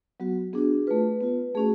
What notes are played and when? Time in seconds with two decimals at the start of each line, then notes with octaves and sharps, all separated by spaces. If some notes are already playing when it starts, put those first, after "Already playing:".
0.20 F#3 B3 F#4
0.53 B3 D4 F#4 G#4
0.87 A3 F4 B4
1.21 B3 F4
1.55 A3 C#4 F#4 G#4